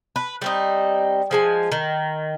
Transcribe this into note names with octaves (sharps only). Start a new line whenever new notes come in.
B4
G3 C4 D#4
F3 G#3 G#5
D#3